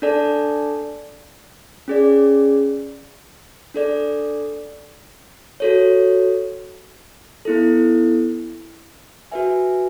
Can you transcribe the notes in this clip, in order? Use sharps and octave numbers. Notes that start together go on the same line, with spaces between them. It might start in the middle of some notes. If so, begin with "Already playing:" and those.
D4 A4 D5 A5
C#4 G#4 D5
D4 A4 D5
F#4 A4 C#5
B3 E4 A4
F#4 B4 E5 G#5